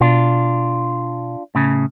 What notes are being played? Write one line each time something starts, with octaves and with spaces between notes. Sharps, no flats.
B2 D4 F4
A2 C#3